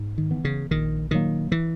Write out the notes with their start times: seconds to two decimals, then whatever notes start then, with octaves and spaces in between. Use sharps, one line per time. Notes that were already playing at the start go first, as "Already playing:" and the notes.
Already playing: G#2
0.18 D#3
0.31 E3 B3
0.45 C#3
0.71 A#1 D#3
1.11 A#2 D#3 F#3 A#3
1.52 E3